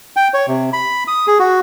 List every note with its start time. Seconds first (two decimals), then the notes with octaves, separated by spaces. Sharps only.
0.16 G5
0.34 C#5
0.48 C3
0.73 B5
1.08 D#6
1.27 G#4
1.39 F#4